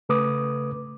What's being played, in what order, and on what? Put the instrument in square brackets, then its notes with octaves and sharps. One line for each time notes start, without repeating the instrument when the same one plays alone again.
[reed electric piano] C#3 A3 B4 D6 D#6